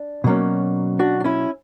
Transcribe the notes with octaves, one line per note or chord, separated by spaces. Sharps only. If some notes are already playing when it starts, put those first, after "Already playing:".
Already playing: D4
B2 F#3 A#3 C#4
D4 F#4
D4
C#4 E4